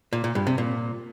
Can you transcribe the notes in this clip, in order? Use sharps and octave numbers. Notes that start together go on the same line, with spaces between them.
A#2
A#2
G2
C3
A#2